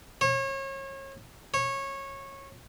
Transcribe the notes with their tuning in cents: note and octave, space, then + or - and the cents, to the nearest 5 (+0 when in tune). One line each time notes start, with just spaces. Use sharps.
C#5 -35
C#5 -20